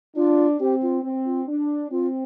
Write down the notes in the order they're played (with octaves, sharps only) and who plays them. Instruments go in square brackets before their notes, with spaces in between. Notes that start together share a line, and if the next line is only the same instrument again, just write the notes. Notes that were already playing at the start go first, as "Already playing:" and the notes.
[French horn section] D4 [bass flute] F4
[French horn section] C4 [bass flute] G4
[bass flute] F4
[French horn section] C4
[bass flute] F4
[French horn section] D4
[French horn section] C4 [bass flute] F4